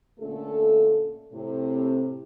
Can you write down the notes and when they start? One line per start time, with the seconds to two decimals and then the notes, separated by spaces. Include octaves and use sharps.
0.20 A#2 D3 A3 C#4 A4
1.33 A2 C3